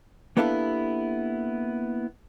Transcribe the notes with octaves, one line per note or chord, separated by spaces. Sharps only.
A#3 B3 D4 E4 G4 A4